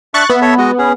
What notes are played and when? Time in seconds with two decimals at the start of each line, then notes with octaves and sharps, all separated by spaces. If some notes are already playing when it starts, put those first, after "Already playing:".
0.14 D4 E5 C#6 F#6 A6
0.30 B3 E5
0.42 A4 C#5 E5
0.58 G#3 F#4 D#5
0.78 C#4 G#4